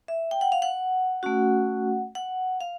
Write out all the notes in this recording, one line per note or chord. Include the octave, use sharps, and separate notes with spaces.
E5
G5
F#5
F5
F#5
A3 C#4 F#4
F#5
F5